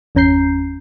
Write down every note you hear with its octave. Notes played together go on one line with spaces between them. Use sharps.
G1 E2 C#4 A#5 G6 C7